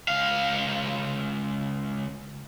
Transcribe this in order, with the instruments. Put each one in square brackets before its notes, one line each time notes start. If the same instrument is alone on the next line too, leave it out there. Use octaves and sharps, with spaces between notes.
[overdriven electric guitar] C#2 F5